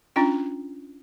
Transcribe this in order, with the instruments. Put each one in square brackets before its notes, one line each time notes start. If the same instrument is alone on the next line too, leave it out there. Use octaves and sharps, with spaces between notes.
[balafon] C#4 D4 F4 G5